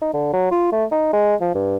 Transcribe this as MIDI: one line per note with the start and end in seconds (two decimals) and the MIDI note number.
0.01 0.11 63
0.13 0.32 50
0.33 0.48 54
0.51 0.71 65
0.72 0.85 57
0.91 1.12 63
1.13 1.35 56
1.41 1.50 53
1.55 1.77 43